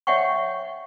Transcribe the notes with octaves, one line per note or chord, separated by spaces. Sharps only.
C#5 D#5 E5 F#5 G5 C#6